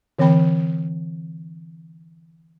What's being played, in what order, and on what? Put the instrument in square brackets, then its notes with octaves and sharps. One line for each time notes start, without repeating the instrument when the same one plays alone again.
[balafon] D3 E3 C4 G5 B5